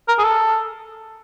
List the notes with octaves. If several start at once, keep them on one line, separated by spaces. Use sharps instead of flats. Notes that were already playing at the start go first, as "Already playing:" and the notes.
A#4
G#4
A4